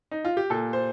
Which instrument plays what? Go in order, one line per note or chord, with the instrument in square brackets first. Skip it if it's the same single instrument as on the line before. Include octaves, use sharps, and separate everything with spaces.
[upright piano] D#4
F4
G4
A#2 A4
C5